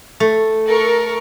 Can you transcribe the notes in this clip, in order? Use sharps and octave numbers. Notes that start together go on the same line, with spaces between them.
A3
A4 A#4 C#6